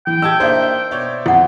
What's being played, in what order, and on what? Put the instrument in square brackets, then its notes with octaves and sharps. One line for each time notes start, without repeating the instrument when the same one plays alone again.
[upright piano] E3 [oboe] G5
[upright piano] G4 E6 [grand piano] D#5 A5 G#6
[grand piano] A#3 D4 D#4 [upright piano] C5 E5
[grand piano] B2 C#5 D5
[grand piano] F2 [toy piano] E4 F#5